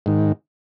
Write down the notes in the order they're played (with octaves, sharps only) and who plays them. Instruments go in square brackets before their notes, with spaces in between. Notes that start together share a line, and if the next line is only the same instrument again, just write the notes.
[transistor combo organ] G#2 D#3